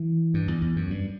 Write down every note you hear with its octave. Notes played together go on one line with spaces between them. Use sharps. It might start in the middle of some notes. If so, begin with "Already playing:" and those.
Already playing: E3
G2
E2
E2
F#2
G2